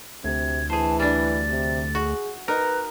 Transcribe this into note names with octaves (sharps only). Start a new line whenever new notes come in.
D2 C3 G#6
E3 G#4 C5 A5
G3 D4 A6
C3
F#4 G#4
D#4 A#4 B4 F#6